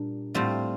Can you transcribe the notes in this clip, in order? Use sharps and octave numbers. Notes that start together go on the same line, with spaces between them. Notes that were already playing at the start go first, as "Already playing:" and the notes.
Already playing: A#2 G3 D4
A2 G3 C4 F4